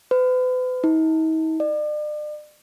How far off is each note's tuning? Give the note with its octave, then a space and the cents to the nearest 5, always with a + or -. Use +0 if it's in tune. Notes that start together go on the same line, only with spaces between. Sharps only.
B4 +40
D#4 +45
D5 +40